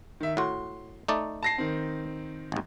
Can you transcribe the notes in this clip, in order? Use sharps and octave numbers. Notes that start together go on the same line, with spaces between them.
D#3 E5
A2 F#4 C6
A3 D#4 D5
A5 A#6 C7
D#3 C4
G#1 D#2